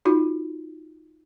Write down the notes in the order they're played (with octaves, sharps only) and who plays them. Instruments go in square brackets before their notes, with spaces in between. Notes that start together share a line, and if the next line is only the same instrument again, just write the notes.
[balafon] D#4 F4 F#4